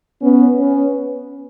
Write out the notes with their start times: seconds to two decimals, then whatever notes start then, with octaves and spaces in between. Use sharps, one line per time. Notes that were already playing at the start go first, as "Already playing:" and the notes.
0.22 B3 C#4
0.59 B3 C#4